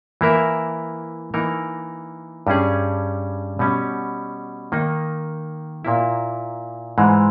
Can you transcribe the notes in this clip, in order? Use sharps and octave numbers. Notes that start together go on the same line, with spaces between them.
E3 A#3 E4 A#4 E5
E3 A#3 D#4 A#4
G2 G3 C#4 G#4
B2 G3 C#4
D#3 A#3 D#4
A#2 A#3 E4
G#2 E3 G#3